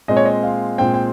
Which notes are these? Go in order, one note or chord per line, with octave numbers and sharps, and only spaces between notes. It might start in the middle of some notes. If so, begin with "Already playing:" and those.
A#2 G#3 C4 D#5
C#5
D#5
F5
A#2 G#3 C4 G5
G5